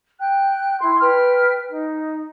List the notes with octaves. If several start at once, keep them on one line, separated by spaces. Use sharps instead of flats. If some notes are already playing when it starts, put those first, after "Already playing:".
G5 F#6
E4 C6
B4 G5 F6
D#4